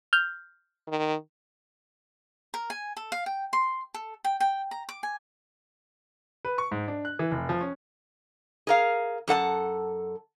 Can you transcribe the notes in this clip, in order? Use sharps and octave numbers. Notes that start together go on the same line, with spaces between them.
F6 G6
D#3
A#4
G#5
A4
F5
G5
C6
A4
G5
G5
A#5
D6
G#5
B4
C#6
G#2
D4
F#6
E3
F1
F3
C#4
G#4 A#4 F5
F#2 A4 F#5 A5